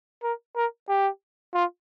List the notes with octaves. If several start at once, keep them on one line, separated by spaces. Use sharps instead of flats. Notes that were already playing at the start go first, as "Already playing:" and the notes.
A#4
A#4
G4
F4